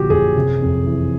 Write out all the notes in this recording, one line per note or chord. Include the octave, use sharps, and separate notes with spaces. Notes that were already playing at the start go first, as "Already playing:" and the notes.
Already playing: A#1 D3 F3 F#4 G4
F#2 G#4
C3
F2
E3